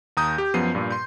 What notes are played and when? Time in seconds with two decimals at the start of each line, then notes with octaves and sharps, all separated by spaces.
0.17 D#2 A#5 D#6 G6
0.38 G4
0.54 F#2 F3 B3 C7 D#7
0.75 G2 A#2
0.91 C6 G6